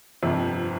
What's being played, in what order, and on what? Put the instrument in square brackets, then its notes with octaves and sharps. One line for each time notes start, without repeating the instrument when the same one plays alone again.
[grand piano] G1 F2 C3